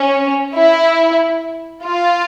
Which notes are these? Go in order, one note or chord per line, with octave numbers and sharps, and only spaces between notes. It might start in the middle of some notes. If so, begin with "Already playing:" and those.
Already playing: C#4
E4
F4